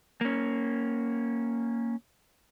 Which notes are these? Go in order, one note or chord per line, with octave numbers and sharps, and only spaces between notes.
A#3 C#4